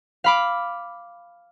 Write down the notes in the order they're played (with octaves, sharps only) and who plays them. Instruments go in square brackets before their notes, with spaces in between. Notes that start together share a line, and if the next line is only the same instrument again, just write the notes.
[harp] F5 B5 D6